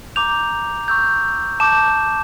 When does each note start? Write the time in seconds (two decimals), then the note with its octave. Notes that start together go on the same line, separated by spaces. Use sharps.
0.16 A#5 D6 G6 F7
0.88 C#6 E6 G6
1.60 A5 D6 G6 E7